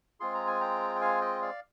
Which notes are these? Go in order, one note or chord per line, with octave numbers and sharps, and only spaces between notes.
G#3 C4 F4 G#4 C6
A#5
G#5
G5 A#5
G5
F5 G#5
D#5 G5
D5 F5